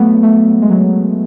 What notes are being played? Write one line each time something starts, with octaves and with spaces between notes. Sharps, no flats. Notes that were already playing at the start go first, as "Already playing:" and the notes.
Already playing: F#3 A3 B3
A3
G#3
F#3